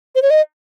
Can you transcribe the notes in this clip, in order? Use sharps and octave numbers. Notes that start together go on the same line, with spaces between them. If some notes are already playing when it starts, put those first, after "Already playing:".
C5
C#5
D#5